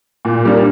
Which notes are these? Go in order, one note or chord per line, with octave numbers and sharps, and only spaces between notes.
A#2
G3 A#3 D4